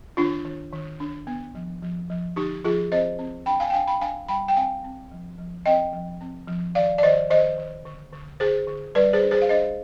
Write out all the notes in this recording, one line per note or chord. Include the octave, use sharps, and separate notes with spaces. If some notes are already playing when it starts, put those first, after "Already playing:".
D#3 D4 F4
D#3
D#3
D4
B3
F3
F3
F3
D3 D#4 G4
F3 F4 G#4
C4 C5 D#5
C4
D4 G5 B5
F5 G#5
G5
D4 F5 G#5
G5 B5
D4 F5 G#5
G3 G5 B5
G5
C4 F5 G#5
C4
F3
F3
C4 D#5 G5
F3
C4
F3
D#3 D5 F5
D5
D#3 C5 D#5
D#3 C5 D#5
D#3
D3
D3
D3 G#4 C5
D3
G3 B4 D5
G#4 C5
D4
G#4 C5
F5
D4 C5 D#5